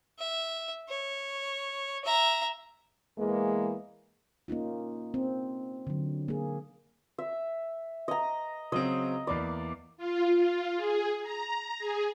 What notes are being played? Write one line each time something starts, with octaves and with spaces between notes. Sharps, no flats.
E5
C#5
E5 A#5
E2 E3 G#3 A#3
A#3 C#4 D#4 F4
C4
D3 F#3
A#3 G#4
E5
D#5 A#5
C#3 F#3 C4 D#5
E2 A#3 D5 B5
F4
F4
G#4
A#5
G#4